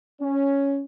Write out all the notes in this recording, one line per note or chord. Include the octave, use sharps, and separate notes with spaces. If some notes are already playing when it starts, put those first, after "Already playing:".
C#4